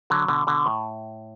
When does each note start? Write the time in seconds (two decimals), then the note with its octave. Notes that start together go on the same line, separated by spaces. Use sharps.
0.10 D3 F#3
0.28 B2 D3
0.47 B2 D3
0.66 A2